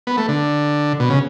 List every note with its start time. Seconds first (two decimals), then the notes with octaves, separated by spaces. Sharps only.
0.07 B3
0.17 A3
0.28 D3
1.00 B2
1.10 C#3